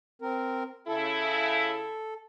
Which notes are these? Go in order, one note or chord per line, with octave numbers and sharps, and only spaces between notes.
C4 A#4
C#3 E4 A4